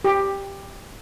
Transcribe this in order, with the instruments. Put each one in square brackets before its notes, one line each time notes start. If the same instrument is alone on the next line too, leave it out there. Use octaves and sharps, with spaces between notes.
[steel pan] G4